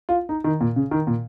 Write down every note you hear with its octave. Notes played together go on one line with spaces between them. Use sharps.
F4
D#4
D#3
A#2
C#3
D#3
A#2